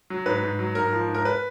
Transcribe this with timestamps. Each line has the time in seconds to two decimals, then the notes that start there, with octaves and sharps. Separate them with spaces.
0.10 F#3
0.26 G#2 B4
0.43 G#2
0.59 F#3
0.75 G#2 A#4
0.93 F3
1.08 G#2
1.15 A#4
1.25 B4